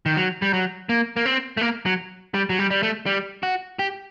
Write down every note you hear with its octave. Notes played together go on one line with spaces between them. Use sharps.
D#3
F#3
G3
F#3
A#3
A#3
C4
A3
A#3
F#3
G3
F#3
G3
G3
A3
G3
F#4
G4